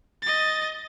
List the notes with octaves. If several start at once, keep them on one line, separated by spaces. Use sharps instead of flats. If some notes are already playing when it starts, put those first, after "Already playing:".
D#5 A6